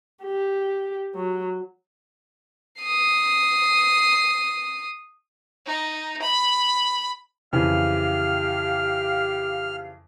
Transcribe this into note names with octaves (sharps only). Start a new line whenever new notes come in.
G4
F#3
D#6 C7
D#4
B5
F2 C#3 E3 G4 F5 F6